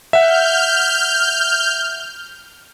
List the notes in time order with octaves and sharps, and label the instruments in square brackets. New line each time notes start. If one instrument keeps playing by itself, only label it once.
[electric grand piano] E5 F#5 [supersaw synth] F6 G6